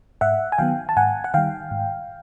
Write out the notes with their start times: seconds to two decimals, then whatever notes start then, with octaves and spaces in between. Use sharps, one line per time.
0.21 G#2 E5 F#5
0.52 G#5
0.58 D#3 F#3 B3 F5 G5
0.89 A5
0.97 G#2 F#5 G#5
1.24 F#5
1.34 D#3 G3 F5 G5
1.71 G#2